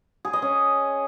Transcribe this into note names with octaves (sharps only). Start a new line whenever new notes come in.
G#4
D#5
C#4